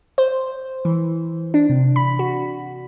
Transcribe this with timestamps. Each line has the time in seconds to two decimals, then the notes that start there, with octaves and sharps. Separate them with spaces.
0.18 C5
0.85 E3
1.54 D4
1.70 C3
1.96 B5
2.19 F#4